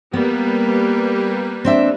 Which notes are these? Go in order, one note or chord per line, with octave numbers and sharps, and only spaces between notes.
G3 A#3 B3 B4
C4 D4 E5